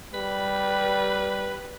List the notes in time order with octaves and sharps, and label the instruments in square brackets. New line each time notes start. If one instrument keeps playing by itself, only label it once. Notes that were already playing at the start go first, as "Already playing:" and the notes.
[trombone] G3 [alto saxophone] B4